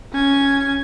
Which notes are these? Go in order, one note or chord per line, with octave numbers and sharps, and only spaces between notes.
C#4 G#6